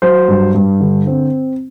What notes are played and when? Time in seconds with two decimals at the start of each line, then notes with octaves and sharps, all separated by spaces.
0.02 F#3 C5
0.28 G2
0.55 G2
0.80 D3
1.07 C4